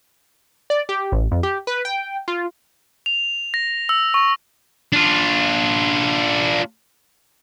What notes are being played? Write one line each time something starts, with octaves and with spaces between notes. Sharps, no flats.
D5
G4
A1
F2
G4
B4
G5
F4
F7
A#6
E6
C#6
D4 F4